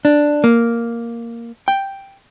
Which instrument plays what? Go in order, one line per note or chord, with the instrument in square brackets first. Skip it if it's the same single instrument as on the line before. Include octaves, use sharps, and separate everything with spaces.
[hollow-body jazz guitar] D4
A#3
G5